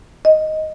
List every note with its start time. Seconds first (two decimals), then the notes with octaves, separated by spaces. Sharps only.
0.25 D#5